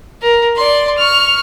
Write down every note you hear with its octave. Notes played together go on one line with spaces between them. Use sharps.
A#4
D5 C6
C#6 F6